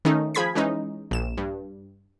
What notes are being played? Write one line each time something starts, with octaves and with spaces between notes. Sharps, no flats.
D#3 A3 C#4 D#4
F3 G#4 B5 G#6 B6
E3 G#3 C#4 D#4
A#1 E7
G2